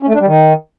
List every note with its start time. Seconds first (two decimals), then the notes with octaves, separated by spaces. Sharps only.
0.03 C#4
0.09 A3
0.15 D4
0.21 G3
0.27 D#3